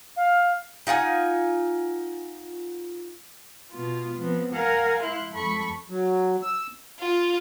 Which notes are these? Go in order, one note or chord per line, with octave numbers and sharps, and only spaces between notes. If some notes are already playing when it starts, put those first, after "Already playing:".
F5
D#4 F4 F#5 G#5
B2 B3 F4
F3 B3 C4
A#4 F5 F#5 G#5
E4 C6 F#6
F2 A4 B5 C#6
F#3
E6
F4